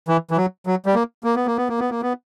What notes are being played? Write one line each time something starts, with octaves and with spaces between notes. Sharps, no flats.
E3
E3
F#3
F#3
G3
A#3
A#3
B3
A#3
B3
A#3
B3
A#3
B3